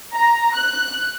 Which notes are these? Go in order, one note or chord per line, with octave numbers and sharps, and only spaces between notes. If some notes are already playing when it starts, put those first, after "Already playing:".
A#5
F#6